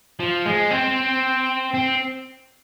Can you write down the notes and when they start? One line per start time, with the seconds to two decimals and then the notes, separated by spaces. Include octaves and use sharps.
0.20 F3
0.46 G#3
0.71 C4
1.74 C4